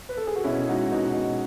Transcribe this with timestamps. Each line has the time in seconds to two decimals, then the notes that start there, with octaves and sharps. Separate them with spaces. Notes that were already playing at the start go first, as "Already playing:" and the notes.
0.09 B4
0.17 A4
0.27 G#4
0.36 F#4
0.44 B2 C#4 E4
0.69 G#3 D#4 F#4
0.92 B2 D#4 F#4
1.16 B2